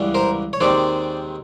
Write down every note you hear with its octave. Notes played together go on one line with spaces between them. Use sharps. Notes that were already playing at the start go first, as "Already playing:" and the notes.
Already playing: C#2 C#3 E3 G3 B3
A#4 C5
C#5
D#2 D#3 G#3 C4 C5 D5